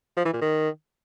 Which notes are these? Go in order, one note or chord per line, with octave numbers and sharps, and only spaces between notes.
F3
E3
A#2
D#3